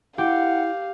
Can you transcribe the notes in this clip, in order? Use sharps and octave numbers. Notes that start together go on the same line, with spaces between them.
E4 G4 F5 F#5